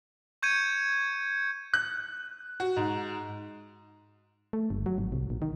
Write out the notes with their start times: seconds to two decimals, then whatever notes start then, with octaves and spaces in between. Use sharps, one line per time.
0.42 C#6 G6 G#6 C#7 D#7
1.74 F#6
2.60 F#4
2.76 G#2
4.53 A3
4.70 G1
4.86 F#3
4.98 G#1
5.12 C2
5.30 A#1
5.42 D#3